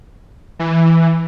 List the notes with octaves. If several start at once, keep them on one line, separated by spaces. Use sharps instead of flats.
E3